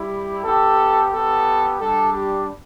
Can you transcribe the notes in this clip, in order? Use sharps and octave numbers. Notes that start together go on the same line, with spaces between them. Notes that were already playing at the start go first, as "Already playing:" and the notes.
Already playing: G3 E4 G4
B3 G4 A4
B3 G4 A4
G3 D4 G4 A4
G4